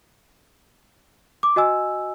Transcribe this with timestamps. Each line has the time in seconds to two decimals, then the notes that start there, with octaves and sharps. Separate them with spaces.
1.43 D6
1.56 F#4 D#5 G#5 E6